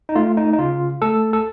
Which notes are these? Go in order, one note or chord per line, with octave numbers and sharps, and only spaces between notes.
D#4
A3 F4
D#4
D#4
C#3 F4
A3 A4
A4